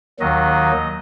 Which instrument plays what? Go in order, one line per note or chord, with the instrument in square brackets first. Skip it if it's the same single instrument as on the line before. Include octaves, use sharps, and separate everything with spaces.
[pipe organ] D#2 D#3 F#3 D#5